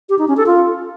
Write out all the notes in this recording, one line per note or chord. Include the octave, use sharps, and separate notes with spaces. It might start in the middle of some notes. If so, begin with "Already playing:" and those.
G4
D#4
C#4
A4
F4